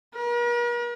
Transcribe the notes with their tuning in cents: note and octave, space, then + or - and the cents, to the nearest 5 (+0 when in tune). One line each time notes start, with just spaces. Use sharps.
A#4 +45